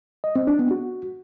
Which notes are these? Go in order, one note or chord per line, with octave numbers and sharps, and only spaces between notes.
D#5
C4
D4
B3
F#4